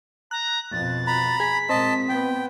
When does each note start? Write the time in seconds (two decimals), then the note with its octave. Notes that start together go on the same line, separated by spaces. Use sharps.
0.31 A#5 F#6
0.72 F2 B2 A6
1.07 A#5 B5
1.40 G#4 B6
1.69 A#2 G#3 C4 D#5 A5
2.09 B3 G5